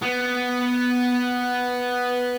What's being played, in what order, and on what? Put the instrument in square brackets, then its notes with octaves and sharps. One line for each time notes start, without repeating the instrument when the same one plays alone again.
[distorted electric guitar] B3